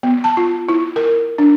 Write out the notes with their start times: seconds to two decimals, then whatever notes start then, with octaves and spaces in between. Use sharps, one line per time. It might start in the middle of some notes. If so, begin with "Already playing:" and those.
0.03 B3
0.24 A5
0.37 F4
0.69 E4
0.96 A#4
1.38 D4